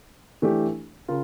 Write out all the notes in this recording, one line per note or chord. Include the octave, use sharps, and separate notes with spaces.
E3 A3 D4 G4
C#3 F4 A#4